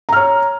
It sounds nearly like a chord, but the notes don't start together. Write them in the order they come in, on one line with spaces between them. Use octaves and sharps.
A#5 F6 C#5